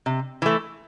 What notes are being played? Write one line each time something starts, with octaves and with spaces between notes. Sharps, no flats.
C3
E3 A3